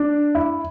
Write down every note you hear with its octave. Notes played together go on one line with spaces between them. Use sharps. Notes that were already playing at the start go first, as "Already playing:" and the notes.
Already playing: D4
E4